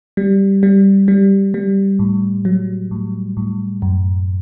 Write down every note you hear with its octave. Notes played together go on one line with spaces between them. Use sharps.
G3
G3
G3
G3
A2
F#3
A2
A2
F#2